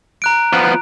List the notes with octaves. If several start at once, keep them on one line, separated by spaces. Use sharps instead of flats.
A#5 F#6 D7
F3 B3